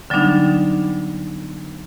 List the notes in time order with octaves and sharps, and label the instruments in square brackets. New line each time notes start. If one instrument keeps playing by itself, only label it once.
[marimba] D3 F#3 G3 B3 D4 D#4